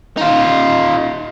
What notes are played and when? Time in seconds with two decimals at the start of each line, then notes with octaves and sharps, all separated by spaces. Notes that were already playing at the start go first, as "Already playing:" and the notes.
0.17 D#4 F4